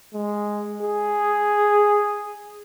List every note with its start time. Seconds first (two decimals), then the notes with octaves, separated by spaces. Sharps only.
0.14 G#3
0.82 G#4